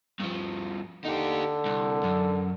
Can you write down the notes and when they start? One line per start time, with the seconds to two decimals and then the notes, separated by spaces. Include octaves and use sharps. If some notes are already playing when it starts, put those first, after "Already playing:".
0.20 G2 F3
1.05 D3 D#4 G4
1.65 C2
2.04 F#2